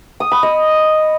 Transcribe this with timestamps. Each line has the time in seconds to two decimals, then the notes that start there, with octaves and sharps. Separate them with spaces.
0.20 D#6
0.32 B5
0.43 D#5